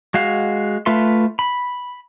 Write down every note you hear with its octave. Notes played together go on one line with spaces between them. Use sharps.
G#3 F#4 F5
A3 F4 B4 E5 C6
B5